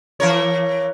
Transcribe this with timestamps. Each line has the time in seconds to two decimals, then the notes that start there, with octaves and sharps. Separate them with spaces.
0.20 E3 A#4 C#5